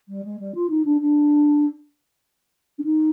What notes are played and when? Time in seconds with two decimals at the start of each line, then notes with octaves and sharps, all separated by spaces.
0.08 G3
0.24 G#3
0.39 G3
0.55 F4
0.69 D#4
0.85 D4
1.00 D4
2.78 D4
2.84 D#4